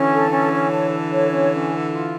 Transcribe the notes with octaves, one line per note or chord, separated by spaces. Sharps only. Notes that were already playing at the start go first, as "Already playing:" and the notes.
Already playing: D3 E3 C#4
A4
C#4
C#5
A4
A4
C#5
C#4
C#4
A4
F4